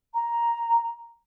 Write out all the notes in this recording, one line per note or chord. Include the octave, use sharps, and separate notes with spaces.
A#5